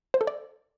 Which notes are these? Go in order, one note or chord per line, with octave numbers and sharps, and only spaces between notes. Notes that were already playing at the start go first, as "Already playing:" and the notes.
C5
A4
D5